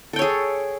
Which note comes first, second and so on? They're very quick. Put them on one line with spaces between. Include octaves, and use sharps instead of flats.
A4 G5 C#5 G#4